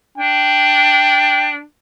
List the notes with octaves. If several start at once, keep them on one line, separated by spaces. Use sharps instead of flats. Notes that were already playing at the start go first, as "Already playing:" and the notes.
D4 G5